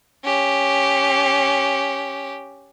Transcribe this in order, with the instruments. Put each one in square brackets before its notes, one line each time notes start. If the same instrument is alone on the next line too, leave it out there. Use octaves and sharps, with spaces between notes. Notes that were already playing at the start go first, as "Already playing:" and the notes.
[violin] C#4 G4